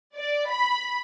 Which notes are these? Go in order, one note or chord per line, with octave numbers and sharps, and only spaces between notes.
D5
B5